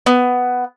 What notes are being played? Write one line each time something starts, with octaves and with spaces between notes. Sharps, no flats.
B3